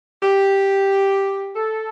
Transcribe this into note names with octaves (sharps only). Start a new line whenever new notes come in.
G4
A4